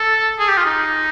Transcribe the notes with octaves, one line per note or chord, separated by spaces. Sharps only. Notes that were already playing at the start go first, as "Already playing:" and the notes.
Already playing: A4
G#4
G4
F4
D#4